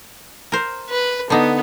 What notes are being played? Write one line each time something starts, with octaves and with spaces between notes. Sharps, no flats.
A#4 C5
B4
D3 B3 D#4